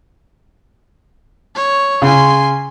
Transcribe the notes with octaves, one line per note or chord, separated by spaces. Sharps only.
C#5
C#3 G#5 C6